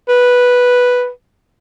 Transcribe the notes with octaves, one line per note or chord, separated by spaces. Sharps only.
B4